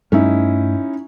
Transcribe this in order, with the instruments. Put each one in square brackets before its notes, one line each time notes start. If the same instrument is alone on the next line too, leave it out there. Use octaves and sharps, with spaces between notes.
[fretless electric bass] G2 G3 A3 [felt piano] C#4 D#4 E4